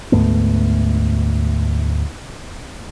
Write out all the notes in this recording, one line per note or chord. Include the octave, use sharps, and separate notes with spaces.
D2 G#2 A3 B3